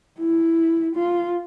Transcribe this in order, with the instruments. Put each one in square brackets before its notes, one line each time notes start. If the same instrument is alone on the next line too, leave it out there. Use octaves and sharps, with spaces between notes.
[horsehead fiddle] E4
F4